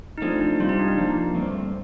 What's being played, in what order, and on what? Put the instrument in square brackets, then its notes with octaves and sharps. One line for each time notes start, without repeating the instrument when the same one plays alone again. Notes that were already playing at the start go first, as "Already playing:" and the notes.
[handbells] D#4
[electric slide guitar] F3 A3 C4 [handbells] D4
[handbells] D#4
[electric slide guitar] C3 G3 C4 G4 [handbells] F4
[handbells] D#4
D4
D#4
[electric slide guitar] F3 A#3 D4
G2 D3 A3 C4